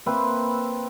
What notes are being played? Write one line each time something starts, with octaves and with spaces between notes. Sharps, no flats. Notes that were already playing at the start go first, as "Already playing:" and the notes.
A#3 C4 B4 E5